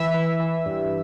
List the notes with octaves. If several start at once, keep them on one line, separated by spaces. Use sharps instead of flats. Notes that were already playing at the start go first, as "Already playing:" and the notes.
Already playing: E3 E5
E3
E3
G2